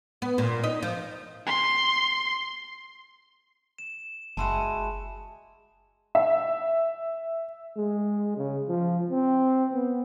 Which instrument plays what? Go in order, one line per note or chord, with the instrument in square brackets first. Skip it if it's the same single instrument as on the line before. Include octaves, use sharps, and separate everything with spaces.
[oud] B3
A#2
D#4
F3
[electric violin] C6
[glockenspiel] E7
[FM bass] F#1 [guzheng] G#3 E4 F#4 [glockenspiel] A5 C6 E7
[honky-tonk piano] E5
[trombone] G#3
C#3
F3
C4
B3